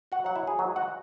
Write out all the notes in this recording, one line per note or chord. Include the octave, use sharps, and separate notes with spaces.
F#4 F#5
F#3 F#5
E4 E5
G#4
G#2 F#3 F#4
F#4 F#5